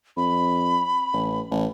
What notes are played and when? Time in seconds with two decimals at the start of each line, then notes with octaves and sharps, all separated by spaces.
0.17 F2 B5
1.13 A1
1.51 A1